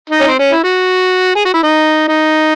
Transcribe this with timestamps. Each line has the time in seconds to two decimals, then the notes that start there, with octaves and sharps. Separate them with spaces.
0.10 D#4
0.20 C#4
0.28 C4
0.39 C#4
0.52 E4
0.64 F#4
1.35 G#4
1.45 F#4
1.54 E4
1.63 D#4
2.08 D#4